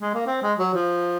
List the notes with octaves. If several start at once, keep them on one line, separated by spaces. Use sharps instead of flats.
G#3
A#3
C4
G#3
F#3
F3